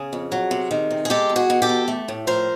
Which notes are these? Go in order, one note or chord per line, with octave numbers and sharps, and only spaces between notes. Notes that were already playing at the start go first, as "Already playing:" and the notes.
Already playing: C#3 G#4
F2
F#3
C3
D#3
C3
G#4
G#3 G4 A4
E2
F#4 G#4
B2
G4 A4
E2
A3
A2
F3 A#4 C5